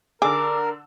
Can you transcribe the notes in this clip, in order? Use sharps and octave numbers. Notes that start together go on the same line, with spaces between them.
D3 D4 G#4 A#4 D6 E6